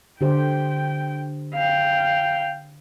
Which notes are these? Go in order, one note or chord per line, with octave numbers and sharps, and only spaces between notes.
D3 G4 C5 G5
F5 G5